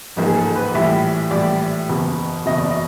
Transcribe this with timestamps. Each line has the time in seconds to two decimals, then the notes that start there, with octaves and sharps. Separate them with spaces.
0.16 A1 G#2 F3 A#3
0.26 G#4
0.36 A4
0.55 B4
0.74 A#1 A2 E3 G3 E5
1.31 A#1 A2 E3 G3 D5
1.89 F#1 E2 B2
2.46 F#1 E2 B2 D#5
2.58 D5
2.71 D#5